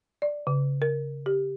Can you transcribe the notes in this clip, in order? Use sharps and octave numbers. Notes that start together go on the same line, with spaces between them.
D5
C#3
A#4
G4